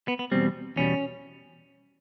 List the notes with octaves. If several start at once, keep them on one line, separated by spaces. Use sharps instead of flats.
B3
B3
E2 B2 G3 C4
E2 B2 G3 C#4